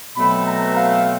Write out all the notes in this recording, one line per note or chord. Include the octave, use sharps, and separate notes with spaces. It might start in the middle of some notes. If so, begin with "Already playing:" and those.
B2 F#3 A3 C4 B5
A#5
F5